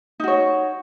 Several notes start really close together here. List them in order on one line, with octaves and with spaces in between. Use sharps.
D#4 F#4 C#5